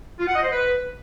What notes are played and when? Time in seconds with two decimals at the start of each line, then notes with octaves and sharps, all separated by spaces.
0.20 F4
0.28 F#5
0.36 D#5
0.44 C5
0.52 B4